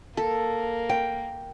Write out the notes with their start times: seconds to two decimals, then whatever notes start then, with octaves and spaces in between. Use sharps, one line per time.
0.17 A#3 A4
0.89 G5